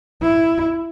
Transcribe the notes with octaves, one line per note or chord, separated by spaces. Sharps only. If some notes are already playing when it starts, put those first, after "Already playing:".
E4